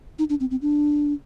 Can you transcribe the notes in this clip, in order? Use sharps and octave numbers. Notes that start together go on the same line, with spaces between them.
D#4
D4
C4
C4
D4